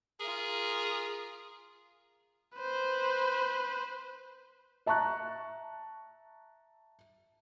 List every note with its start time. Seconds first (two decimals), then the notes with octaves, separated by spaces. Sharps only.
0.20 F4 G#4 A#4
2.56 B4 C5
4.86 E5 A5 A#5 C#6 F#6